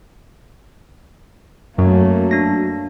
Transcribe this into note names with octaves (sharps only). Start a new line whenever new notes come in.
F#2 F#3 A3 A#3
D4 A#6